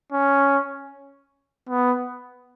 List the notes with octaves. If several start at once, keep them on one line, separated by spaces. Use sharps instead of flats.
C#4
B3